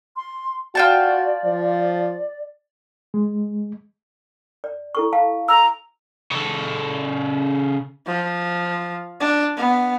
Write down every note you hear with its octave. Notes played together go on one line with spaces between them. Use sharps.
C6
F4 F#4 D5 G5 A5
F3
G#3
D5
E4 A4 C#6
F5 A5
A#5 E6
C#3 A4
F3
D4
B3